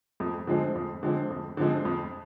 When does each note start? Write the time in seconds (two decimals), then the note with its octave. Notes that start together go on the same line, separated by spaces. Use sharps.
0.20 F2
0.47 D3 F3 G#3 C4
0.75 F2
1.03 D3 F3 G#3 C4
1.30 F2
1.57 D3 F3 G#3 C4
1.85 F2